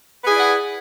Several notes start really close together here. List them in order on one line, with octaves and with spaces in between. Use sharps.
B4 G#4 E4 D5 F#5